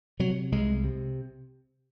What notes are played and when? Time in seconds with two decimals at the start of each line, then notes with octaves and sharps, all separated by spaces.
0.20 C3 F#3
0.52 C2 G#3
0.84 C3